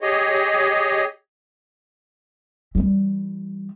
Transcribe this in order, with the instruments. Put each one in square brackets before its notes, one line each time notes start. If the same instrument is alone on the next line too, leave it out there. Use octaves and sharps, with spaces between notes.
[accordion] G4 G#4 C#5 D#5
[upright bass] E3 G3